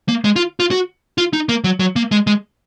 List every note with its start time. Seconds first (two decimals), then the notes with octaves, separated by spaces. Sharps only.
0.08 A#3
0.25 G#3
0.36 F4
0.60 F4
0.71 F#4
1.18 F4
1.33 D#4
1.49 A#3
1.64 F#3
1.80 F#3
1.96 A#3
2.12 G#3
2.27 G#3